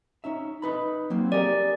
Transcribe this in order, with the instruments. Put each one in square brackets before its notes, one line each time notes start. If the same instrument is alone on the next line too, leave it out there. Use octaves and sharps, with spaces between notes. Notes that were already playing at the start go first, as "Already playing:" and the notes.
[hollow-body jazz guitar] C#4 D#4 E5
D#4 B4 B5
F#3 A#3 C4
[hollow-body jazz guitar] G4 G#4 A#4 [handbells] D5